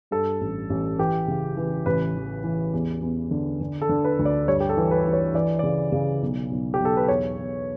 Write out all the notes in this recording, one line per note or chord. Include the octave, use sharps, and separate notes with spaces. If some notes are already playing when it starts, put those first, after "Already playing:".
G2 A4
A1
A1
E3 G4
C#3
E3
A1 B4
E3
E3
E2
E2
D3
D3
A4
D3
B4
D2
D5
G2 C#5
G4
A4
E3
B4
E3
C#5
E3 D5
C#3 D5
C#3
B1
B1
G4
B1
A4
B4
E2 C#5
E2